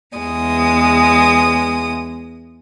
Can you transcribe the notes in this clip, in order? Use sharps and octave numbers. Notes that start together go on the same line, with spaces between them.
E2 G#3 D#6